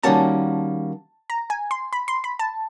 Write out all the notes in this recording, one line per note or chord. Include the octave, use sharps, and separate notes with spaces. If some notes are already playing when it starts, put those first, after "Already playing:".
D#3 G3 A#3 C#4 F#4 A5
A#5
G#5
C6
B5
C6
B5
A5